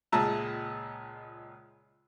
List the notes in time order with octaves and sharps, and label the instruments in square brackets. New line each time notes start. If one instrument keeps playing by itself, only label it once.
[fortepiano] C#2 A#2 G#3 E5 A5 A#5